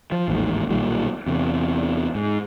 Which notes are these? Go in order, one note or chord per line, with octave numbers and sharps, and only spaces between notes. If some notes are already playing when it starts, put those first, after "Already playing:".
F3
A1 D#2 G#2
B1 A#2 D#3 G3
E2 C3
G#2